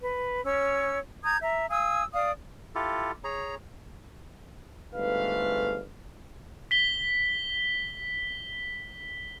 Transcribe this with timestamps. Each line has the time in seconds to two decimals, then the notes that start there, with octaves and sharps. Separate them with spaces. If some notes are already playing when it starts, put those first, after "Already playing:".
0.01 B4
0.44 C#4 C#5 E6
1.24 A#5 D#6 G6 G#6
1.42 E5 A#5
1.69 F5 G#5 D#6 E6
2.13 D5 F5 D#6
2.75 E4 F4 G4 A4
3.24 G#4 C#5 A#5
4.94 G1 G#2 A3 B4 F5
6.71 B6 G7